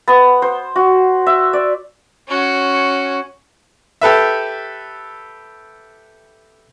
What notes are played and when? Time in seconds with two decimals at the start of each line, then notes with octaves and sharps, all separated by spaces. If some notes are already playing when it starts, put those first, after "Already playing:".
0.08 B3
0.42 C5
0.76 F#4
1.26 E5
1.53 D5
2.28 C#4 F#4
4.01 G4 A4 B4 E5